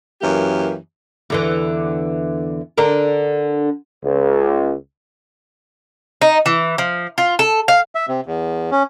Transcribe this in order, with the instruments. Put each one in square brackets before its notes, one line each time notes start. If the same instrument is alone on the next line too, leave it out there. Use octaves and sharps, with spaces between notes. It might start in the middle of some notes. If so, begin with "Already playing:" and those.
[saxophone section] F#2 E3 A#3 G4
[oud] E2 D3 E3
D3 D4 A#4
[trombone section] C#2
[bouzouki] D#4
E3
F3
F4
A4
F5
[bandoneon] E5
C3
E2
C#4